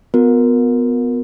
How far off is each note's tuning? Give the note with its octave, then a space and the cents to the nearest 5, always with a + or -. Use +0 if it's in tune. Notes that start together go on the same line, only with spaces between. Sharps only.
B3 +15 F4 +45 A#4 +0